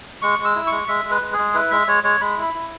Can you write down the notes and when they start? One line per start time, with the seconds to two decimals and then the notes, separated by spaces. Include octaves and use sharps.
0.22 G#3 C#6
0.39 G#3
0.45 E6
0.56 E4
0.67 C#6
0.72 G#3
0.88 G#3 E5
1.05 G#3
1.11 B4
1.21 G#3
1.33 G#4
1.38 G#3
1.54 E4 B4
1.71 G#3 E5
1.87 G#3 C#5
2.04 G#3 C#5
2.20 G#3 B5
2.37 E4
2.42 B5
2.54 E4